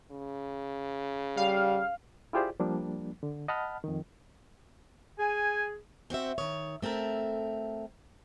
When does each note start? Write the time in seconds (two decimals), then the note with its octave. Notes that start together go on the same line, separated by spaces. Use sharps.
0.11 C#3
1.37 G3 F5
2.33 E4 F4 G4 G#4 C5 D5
2.60 F3 G3 A#3 D4
3.23 D3
3.48 D#5 F#5 A5 B5 F6
3.84 F2 D#3
5.19 G#4 G#5
6.10 C4 F#4 C5 E5
6.38 D#3 C#5
6.82 A3 C4 A4 A#4 E5